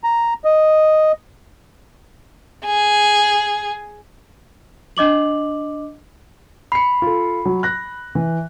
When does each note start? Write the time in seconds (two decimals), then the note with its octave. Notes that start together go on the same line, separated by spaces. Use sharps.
0.04 A#5
0.45 D#5
2.65 G#4
4.97 D4 D#5 D6 F#7
6.72 B5 C7 C#7
7.02 F4 A4
7.45 F#3
7.63 F#6 A#6
8.15 E3